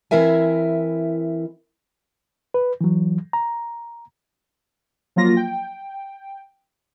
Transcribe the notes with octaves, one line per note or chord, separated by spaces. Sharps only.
E3 C4 E4 A#4 E5 G#5
B4
E3 F#3
A#5
F3 F#3 A#3 F4 A#6
G5